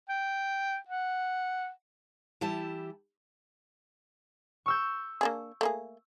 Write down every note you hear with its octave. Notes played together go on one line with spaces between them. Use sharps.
G5
F#5
E3 G3 E4 G4 A5
C#6 E6 G6
A#3 D4 G#4
A3 A#3 G#4